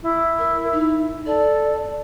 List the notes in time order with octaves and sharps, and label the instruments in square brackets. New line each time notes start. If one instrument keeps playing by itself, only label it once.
[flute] E4
[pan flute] A#4
D#4
[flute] A4 [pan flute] D5